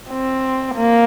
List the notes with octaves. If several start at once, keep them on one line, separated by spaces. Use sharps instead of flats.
C4
A#3